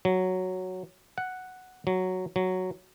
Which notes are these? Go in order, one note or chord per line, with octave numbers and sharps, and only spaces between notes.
F#3
F#5
F#3
F#3